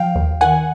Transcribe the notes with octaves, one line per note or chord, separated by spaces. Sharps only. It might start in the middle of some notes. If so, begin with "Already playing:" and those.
Already playing: F3 F5 G5
D#2
D#3 F#5 G#5